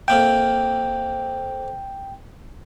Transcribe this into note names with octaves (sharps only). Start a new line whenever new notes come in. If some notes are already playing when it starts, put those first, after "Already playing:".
F2 A#3 E5 G5